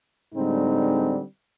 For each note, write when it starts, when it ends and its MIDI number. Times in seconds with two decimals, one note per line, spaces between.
0.34 1.22 45
0.34 1.22 50
0.34 1.22 55
0.34 1.22 56
0.34 1.22 60
0.34 1.22 63